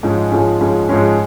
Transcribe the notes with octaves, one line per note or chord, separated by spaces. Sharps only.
G#2 F3 G#3 C#4
G#2 F3 G#3 C#4
G#2 F3 G#3 C#4
G#2 F3 G#3 C#4